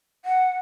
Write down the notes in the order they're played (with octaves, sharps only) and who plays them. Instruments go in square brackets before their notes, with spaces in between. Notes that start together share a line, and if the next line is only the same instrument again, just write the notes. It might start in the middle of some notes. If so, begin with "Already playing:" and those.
[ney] F#5